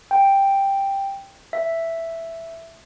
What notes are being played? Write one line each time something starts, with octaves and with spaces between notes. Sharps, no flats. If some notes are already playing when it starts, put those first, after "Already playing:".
G5
E5